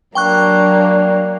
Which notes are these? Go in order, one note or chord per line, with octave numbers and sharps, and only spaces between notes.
F#3 A#3 D4 G5 C#6 F#6